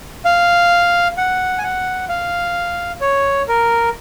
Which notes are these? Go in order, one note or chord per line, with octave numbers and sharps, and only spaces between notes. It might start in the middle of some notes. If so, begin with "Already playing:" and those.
F5
F#5
G#5
F#5
F5
C#5
A#4